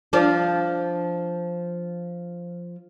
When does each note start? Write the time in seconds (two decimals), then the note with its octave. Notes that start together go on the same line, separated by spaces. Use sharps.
0.13 F3 D4